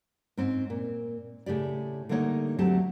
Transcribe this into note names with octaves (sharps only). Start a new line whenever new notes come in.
G#2 C4 C#4
A#2
A2 C#3 G4 D5
D3 G3 A3 A#3 D#4 C#5
D2 F#3 A3 C4 G4 A5